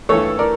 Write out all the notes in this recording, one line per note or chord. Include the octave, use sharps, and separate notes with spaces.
G2 E3 A3 A4 C#5
A#4 D5